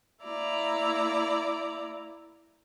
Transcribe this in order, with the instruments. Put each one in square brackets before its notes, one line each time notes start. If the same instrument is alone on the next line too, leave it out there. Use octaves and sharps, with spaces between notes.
[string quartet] A#3 E4 D5 A#5